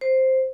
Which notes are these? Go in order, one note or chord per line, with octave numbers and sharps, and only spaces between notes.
C5